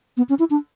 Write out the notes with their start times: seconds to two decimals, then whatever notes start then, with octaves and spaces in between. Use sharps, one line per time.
0.17 B3
0.29 C#4
0.39 E4
0.50 D4